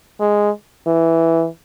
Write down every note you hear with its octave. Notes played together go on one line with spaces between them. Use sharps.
G#3
E3